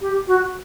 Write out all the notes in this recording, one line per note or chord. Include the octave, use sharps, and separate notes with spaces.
G4
F#4